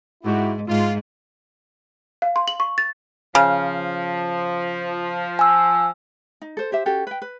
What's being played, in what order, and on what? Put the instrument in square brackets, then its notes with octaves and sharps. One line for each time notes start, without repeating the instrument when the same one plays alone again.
[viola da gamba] G#2 [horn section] E4 F#4 G4
[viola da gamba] G#2 [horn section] F4
[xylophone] F5
C6
F#7
C#6
A6
[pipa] C#3 [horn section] F3
[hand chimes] G#5 E6
[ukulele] D#4
A4 C5
G4 C5 E5
C#4 F#4 G4 A4
B4 G5
B4